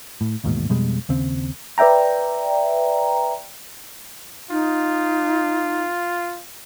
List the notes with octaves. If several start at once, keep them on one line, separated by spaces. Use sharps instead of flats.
A2
A1 D#2 G#2 B2
F2 B2 G3 G#3
D#2 C#3 C4
B4 D5 E5 G5 A#5
D#4 F4